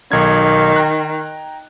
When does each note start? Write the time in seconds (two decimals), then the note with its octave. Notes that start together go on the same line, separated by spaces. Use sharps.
0.12 B1 D#3 G#6
0.76 G5 A#5 F#6